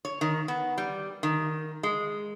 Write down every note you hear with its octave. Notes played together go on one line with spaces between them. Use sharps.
C#5
D#3
B3
G3
D#3
G#3